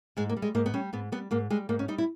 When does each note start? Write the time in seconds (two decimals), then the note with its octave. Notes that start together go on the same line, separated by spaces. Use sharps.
0.17 G#2 G#3
0.29 A#3
0.37 G3
0.42 G#3
0.55 G#2 A#3
0.66 B3
0.74 G3 C#4
0.93 G#2 B3
1.12 G3 B3
1.31 G#2 A#3
1.50 G3 G#3
1.69 G#2 A#3
1.79 C#4
1.88 G3 D#4
1.98 E4